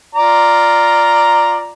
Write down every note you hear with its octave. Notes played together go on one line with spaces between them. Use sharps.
F4 D5 A#5